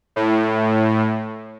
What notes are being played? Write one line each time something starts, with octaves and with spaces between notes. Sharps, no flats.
A2